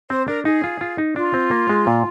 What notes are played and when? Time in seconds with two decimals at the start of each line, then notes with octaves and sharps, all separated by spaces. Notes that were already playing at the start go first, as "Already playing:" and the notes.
0.10 C4 C5
0.27 D4 A#4
0.45 D#4 G#4
0.64 F4
0.81 F4
0.98 D#4
1.16 D4 F4
1.34 C4
1.51 A#3
1.69 G#3
1.87 A#2